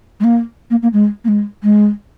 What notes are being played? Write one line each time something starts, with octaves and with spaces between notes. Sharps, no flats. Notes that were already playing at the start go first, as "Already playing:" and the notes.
G#3
A#3
A#3
A#3
G#3
A#3
G#3
G#3